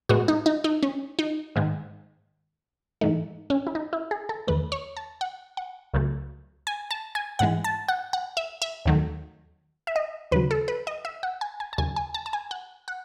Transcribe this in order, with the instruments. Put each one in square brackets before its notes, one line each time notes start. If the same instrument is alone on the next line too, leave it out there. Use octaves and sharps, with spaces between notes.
[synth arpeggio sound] A2 G#3 B3 F#4
D#4
D#4
D#4
C#4
D#4
G#2 D#3 G#3
G#2 E3 A3 D#4
C#4
E4
D#4
E4
G#4
A4
E2 D#3 A3 B4
C#5
A5
F#5
F#5
C#2 C#3 F#3 A3
G#5
A5
G#5
G#2 E3 G#3 F#5
A5
F#5
F#5
E5
E5
D#2 D#3 F#3 A3
E5
D#5
D#2 C#3 F#3 B4
A4
B4
D#5
E5
F#5
G#5
G#5
A5
D#2 C#3 F#3 G#5
G#5
A5
A5
G#5
F#5
F#5